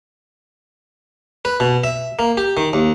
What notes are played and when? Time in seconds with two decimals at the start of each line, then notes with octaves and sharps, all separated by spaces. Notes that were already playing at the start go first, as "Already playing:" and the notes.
1.45 B4
1.60 B2
1.84 E5
2.19 A#3
2.37 G4
2.57 D#3
2.73 D#2